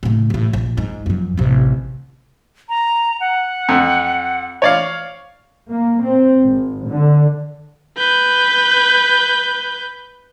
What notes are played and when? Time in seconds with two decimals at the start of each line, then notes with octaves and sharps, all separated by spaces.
0.03 A2 C#3
0.30 A1 A2
0.53 A#1
0.77 G#2
1.06 F#2 F3
1.37 A1 C3
2.69 A#5
3.20 F#5
3.69 F2
4.62 C#5 D5 F5
5.69 A#3
6.03 C4
6.43 G#1
6.88 D3
7.98 B4 G6